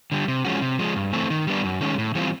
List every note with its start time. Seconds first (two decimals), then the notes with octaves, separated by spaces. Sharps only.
0.12 D3 G3
0.28 C3
0.45 F3 G#3 C#4 F#4
0.62 C3
0.79 F3 G#3
0.96 G2
1.13 E3 A3 C4
1.30 D#3
1.47 G3 B3 D4
1.64 F#2
1.81 D#3 G#3 C#4
1.98 A2
2.15 E3 G3 C4 F4